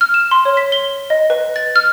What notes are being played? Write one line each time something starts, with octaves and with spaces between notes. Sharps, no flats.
F6
E7
C6
C#5
B6
G7
D#5
B4
A6
F6